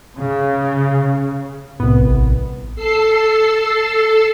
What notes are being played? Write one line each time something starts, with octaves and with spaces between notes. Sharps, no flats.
C#3
C2 A2 B3
A1
A4 E6 C7